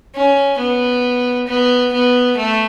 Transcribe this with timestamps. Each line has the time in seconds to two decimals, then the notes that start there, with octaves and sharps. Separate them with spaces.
0.15 C#4
0.59 B3
1.47 B3
1.92 B3
2.37 A3